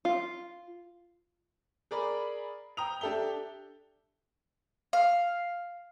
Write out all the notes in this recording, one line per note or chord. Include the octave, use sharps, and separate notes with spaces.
F4
G#4 A#4 D5 B5
G5 A#5 D#6 F7
D4 G4 A4 E5 G7
F5